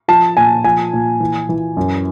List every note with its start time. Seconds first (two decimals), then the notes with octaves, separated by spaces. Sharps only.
0.08 F3 A5
0.37 A#2 G#5
0.64 F3 G#5
0.93 A#2
1.20 E3
1.49 E3
1.77 F#2